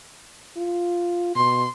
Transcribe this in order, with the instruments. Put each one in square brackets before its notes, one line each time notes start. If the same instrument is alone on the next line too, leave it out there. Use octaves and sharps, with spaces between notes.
[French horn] F4
[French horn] B2 [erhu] C6